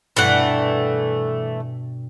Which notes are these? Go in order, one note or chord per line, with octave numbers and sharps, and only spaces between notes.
G2 B2 E3 G3 A3 F#5